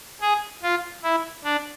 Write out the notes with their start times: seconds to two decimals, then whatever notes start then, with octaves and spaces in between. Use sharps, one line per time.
0.21 G#4
0.63 F4
1.03 E4
1.44 D4